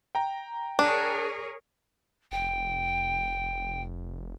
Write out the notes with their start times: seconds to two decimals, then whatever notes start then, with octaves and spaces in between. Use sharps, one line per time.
0.15 G5 A#5
0.79 D4 G#4 A#4 C#5
2.32 F1 G5